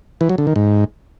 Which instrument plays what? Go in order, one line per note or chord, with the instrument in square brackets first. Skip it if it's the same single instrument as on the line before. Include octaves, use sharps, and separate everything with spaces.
[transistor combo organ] E3
F#3
D3
D#3
G#2